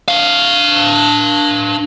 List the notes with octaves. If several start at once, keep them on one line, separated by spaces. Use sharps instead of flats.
D4 F5